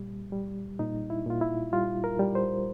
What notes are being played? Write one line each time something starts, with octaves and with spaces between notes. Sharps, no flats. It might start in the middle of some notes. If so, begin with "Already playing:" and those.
Already playing: A#2 G3
G3
A#2 D#4
E4
A#2 F4
E4
G3 F4
A#4
G3
C5